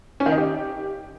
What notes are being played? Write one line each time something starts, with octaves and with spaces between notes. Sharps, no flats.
C#4
D#3
D#4
G4